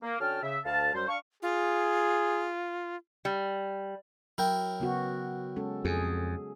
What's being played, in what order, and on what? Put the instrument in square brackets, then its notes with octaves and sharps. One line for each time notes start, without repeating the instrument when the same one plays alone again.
[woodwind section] A#3
D3 C#4 F#4 G5 A5 F6
C#3 E5
D2 F5 A5
F#2 G3 C5
D4 F5 C#6
[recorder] F4 [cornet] G#4
[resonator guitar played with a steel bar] G3
[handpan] F#3 [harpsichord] E4 A#4 G5
[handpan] C#3 B3 F#4
G#3 C#4 A4
[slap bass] F2 [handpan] G#4